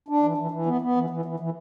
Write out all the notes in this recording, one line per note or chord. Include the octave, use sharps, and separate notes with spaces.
D4
E3
E3
E3
B3
B3
E3
E3
E3
E3